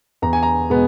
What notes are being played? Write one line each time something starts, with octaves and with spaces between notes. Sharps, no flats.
E2 A#5
G#5
A#5
B2 G#3 B3